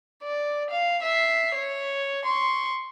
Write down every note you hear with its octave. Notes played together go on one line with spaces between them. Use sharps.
D5
F5
E5 C7
C#5
C6 C#6